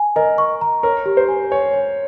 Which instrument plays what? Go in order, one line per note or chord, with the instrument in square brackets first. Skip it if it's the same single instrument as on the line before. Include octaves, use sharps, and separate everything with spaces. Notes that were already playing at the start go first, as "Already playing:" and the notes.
Already playing: [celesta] G#5
[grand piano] A#4 [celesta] D#5
[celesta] C#6
A#5
[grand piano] A#4 [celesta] C#5
[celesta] G4
[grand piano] C5
[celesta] G#5
[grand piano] C#5 [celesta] G#5
[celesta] C#5